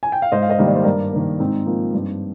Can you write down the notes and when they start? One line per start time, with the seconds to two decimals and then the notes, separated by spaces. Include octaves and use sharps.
0.03 G#5
0.12 G5
0.22 F5
0.32 G#2 C5 D#5
0.42 F5
0.50 C5 D#5
0.58 D#3 G3 A#3
0.67 D5
0.76 C5
0.83 G2 A#4 D5
1.12 D#3 A#3
1.39 G#2 C4 D#4
1.66 F3 A#3
1.94 G2